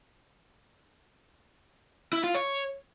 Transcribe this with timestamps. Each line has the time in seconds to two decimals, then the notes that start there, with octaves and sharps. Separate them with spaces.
2.13 E4
2.24 F4
2.35 C#5